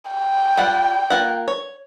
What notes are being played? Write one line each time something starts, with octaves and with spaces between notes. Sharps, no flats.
G5
G3 F4 F#5
A#3 F4 F#5
C#5